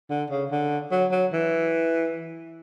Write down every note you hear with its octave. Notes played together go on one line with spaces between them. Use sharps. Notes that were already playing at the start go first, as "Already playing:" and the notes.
D3
C#3
D3
F#3
F#3
E3